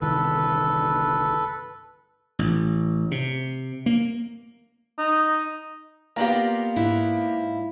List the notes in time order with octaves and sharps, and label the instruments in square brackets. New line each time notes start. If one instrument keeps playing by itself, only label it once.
[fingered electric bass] G1 C2 D#3 [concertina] A4 B4
[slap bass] A1
C3
A#3
[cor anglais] D#4
[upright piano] A#3 B3 G4 [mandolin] F4 D5 A#5
[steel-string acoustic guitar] G#2 E4